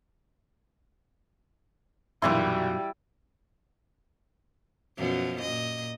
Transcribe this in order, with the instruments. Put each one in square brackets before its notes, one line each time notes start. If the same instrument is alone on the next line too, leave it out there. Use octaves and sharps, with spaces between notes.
[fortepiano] A#1 E3 C6 [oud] F#2 B2 D#4 [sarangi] G3 [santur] E4
[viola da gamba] F#2 B2 F3
A#2 D#5